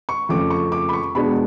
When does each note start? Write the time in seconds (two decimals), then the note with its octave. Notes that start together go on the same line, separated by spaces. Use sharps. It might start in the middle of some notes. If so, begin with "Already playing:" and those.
0.09 C#6
0.29 F2 C#3 F3 A3 D6
0.50 C#6
0.72 D6
0.89 B5
0.93 C#6
1.15 B2 G#3 B3 D4 B5